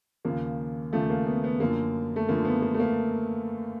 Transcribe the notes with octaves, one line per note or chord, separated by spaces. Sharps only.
D#2 C#3 F3 A#3
D#2 C#3 F3 A3
A#3
B3
B3
F#2 D3 F3 A#3
A3
F#2 D3 F3 A#3
B3
A#3
A3
A#3